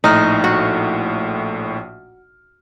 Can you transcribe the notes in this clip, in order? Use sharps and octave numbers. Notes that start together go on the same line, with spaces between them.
A#1 A2 D#4 F6
F#4